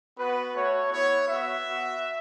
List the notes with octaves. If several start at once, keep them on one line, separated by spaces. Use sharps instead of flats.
B3 F#4 B4
A3 F#4 C#5
B3 E4 C#5
B3 F#4 E5
B3 F#4